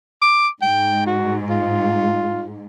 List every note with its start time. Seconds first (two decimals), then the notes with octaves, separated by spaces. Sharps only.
0.22 D6
0.62 G#2 G5
1.07 F#4
1.50 F4